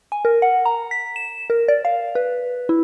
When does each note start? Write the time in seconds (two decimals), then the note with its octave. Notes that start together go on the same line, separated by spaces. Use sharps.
0.12 G#5
0.25 A#4
0.42 F#5
0.66 A#5
0.91 B6
1.16 E7
1.50 A#4
1.68 D5
1.85 F5
2.15 B4
2.69 E4